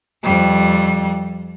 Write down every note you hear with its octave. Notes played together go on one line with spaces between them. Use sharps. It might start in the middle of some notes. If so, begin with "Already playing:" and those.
F2 G3